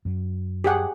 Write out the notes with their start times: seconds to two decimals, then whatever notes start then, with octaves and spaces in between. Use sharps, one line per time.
0.05 F#2 F#3
0.64 G4 G#4 F#5